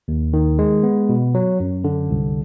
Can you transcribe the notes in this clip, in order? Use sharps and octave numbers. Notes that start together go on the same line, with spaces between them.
D#2
D#3
G#3
B3
B2
F#3
F#2
D3
C2